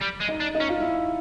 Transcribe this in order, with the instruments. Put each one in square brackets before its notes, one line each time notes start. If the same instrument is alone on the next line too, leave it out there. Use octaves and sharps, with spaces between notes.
[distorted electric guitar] G3
G#3
[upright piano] D#4
[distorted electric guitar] D4
[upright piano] D#4
[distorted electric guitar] C#4
[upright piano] F4
E4